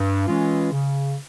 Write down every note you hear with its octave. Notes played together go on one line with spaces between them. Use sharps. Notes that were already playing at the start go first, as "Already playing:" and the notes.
Already playing: G2
E3 G#3 C#4 F4
C#3